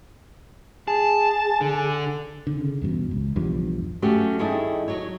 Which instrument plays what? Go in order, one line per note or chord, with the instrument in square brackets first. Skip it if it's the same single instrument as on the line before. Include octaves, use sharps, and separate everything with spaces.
[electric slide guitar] G#4 [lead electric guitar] A5
[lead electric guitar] D3
[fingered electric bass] D3
C#3
E2 G2 B2
C#2
B1 E2 G2 F3
[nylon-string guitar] F#3 A3 C#4 F#4 G4
G2 D#3 E4 G#4 A4 D#5
F#3 C#5